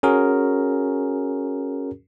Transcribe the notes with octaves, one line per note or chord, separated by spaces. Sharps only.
C#4 F#4 G#4 A#4